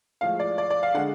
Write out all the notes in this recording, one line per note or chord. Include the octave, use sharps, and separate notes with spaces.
A2 F3 G#3 F5
D5
D5
D5
F5
D3 G#3 F#5